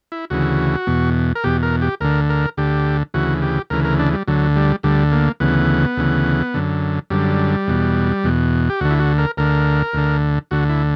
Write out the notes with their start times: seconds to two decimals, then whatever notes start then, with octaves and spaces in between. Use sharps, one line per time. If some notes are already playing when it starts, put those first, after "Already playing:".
0.12 E4
0.30 D2 C#3 E3 F#4
0.87 E2 B2
1.35 A#4
1.44 E2 B2 G4
1.63 A#4
1.82 G4
2.01 D2 D3 A#4
2.30 A#4
2.57 D2 D3 G4
3.14 D2 C#3 E3 F#4
3.42 G4
3.70 D2 C#3 E3 A#4
3.84 A#4
3.99 D4
4.13 G3
4.28 D2 D3 F#3
4.56 G3
4.83 D2 D3 G3
5.12 A#3
5.40 D2 C#3 E3 B3
5.97 D2 C#3 E3
6.54 F#2 D3
7.10 F#2 D3 G3
7.67 E2 B2
8.24 E2 B2
8.70 G4
8.81 D2 D3 F#4
8.91 E4
9.00 F#4
9.18 A#4
9.37 D2 D3 A#4
9.93 D2 D3
10.51 D2 D3 F#4
10.69 E4